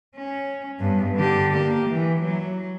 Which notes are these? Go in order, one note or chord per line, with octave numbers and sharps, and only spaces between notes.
C#4
G2 B3
D3 G4
A#3 G4
E3
F#3